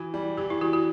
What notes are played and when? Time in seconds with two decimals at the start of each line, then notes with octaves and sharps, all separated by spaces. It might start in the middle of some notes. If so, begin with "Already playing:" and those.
Already playing: E3 F#4
0.14 G3
0.37 E3 G4
0.50 E4
0.61 E3 F#4
0.73 F#4